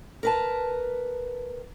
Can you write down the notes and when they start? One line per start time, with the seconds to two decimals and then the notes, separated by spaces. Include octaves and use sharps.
0.23 A#4 B4 A5